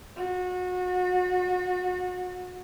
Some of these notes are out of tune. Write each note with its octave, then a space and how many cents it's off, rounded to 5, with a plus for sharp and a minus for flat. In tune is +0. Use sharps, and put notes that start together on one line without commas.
F#4 -30